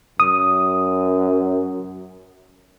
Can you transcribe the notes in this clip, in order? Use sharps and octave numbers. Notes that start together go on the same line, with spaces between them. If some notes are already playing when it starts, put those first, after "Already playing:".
F#2 D#6